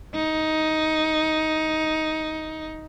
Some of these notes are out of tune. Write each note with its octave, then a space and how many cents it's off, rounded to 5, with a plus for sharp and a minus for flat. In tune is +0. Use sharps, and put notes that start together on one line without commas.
D#4 +10